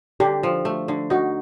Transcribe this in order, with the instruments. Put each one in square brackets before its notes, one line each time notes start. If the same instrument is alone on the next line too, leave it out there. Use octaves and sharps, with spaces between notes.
[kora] D3 [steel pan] G4
[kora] F3
A3
D3
[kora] D#4 [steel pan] F#4